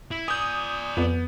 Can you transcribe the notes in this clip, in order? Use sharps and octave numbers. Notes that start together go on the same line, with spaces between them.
E4
D5 G#5 D#6 G6
F2 B3